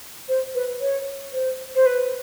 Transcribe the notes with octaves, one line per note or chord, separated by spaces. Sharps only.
C5
B4
C#5
C5
C5
B4